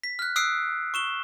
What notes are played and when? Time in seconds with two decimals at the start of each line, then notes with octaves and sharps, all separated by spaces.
0.04 B6
0.19 F6 F#6
0.36 D#6 E6 F#6 C7 D7
0.94 C#6 E7 G7